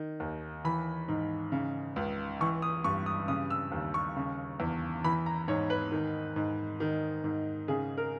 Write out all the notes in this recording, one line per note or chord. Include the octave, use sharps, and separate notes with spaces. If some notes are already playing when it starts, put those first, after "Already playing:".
Already playing: D#3
D#2
E3 B5
G#2
C#3
C#2
E3 C#6
D#6
G2 C#6
D#6
C#3 D#6
E6
D#2
C#6
C#3
E2
E3 B5
A#5
G#2 C#5
B4
D#3
G#2
D#3
G#2
C#3 G#4
A#4